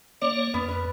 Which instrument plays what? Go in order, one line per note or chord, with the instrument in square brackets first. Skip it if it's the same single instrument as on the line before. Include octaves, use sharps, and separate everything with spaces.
[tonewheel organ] A#3 C#5 [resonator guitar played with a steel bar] D5
[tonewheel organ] F2 [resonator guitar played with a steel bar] B3
[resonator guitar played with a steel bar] B4